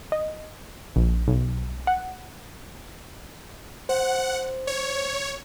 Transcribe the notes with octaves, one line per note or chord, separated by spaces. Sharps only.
D#5
A#1
B1
F#5
C5 F#5
C#5